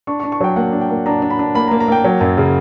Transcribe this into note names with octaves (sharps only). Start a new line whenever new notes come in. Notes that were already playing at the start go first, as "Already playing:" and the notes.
D4 C#6
C#6
D4
C#6
F#3 G5
A#3 F#5
D4
G5
A#3
D4 A#5
D4
B5
D4
A#3 B5
A#3 A#5
A#5
A#3 G5
F#3
F#2
C#3